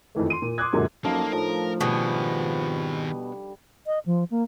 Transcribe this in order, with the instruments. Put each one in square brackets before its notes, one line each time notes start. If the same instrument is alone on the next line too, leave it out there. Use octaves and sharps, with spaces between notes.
[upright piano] F2 D#3 E3 A3
C6 D#7
A#2
C6 D6 D#6 F#6 G#6
F#2 A#2 D3 F#3 G#3
[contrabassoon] F#2 [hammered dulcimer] F3 D#4 A4 [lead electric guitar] A#3
[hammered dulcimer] A2 D4 A#5 [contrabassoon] F3 [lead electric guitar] A#4
[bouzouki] B2 [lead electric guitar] D#3 G#4 [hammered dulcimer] G3
[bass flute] D#5
F3
A#3